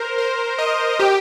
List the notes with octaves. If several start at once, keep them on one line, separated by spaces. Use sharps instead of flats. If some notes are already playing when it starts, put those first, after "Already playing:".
Already playing: A#4 C5
C5
D#5
G4